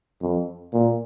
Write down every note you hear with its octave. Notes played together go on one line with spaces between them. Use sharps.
F2
A#2